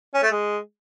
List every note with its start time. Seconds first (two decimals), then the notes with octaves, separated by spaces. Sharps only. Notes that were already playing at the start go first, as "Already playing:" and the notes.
0.14 C#4
0.23 A3
0.31 G#3